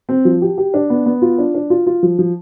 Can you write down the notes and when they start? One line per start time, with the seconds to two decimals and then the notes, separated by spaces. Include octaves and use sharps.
0.09 C4
0.25 F3
0.42 G4
0.58 G4
0.74 D4
0.90 B3
1.06 B3
1.22 F4
1.38 D4
1.55 D4
1.70 F4
1.86 F4
2.03 F3
2.19 F3